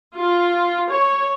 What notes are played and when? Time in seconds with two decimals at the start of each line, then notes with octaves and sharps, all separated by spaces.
0.16 F4
0.91 C#5